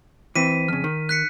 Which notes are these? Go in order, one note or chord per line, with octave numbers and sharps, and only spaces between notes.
E3 C4 B6 D#7
F2 C#3 F6
D#3
F#6 B6 C#7